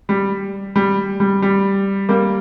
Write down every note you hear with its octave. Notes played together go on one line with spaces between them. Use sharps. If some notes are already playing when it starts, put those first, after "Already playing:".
G3
G3
G3
G3
G3 A#3